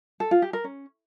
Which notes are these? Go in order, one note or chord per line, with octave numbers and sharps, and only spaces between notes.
A4
F4
G4
A#4
C#4